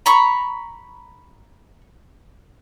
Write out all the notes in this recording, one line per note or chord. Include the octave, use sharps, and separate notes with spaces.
A#5 B5 C#6